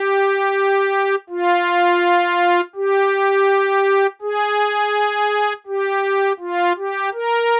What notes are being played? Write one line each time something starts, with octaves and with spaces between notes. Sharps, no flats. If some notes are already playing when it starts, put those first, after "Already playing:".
Already playing: G4
F4
G4
G#4
G4
F4
G4
A#4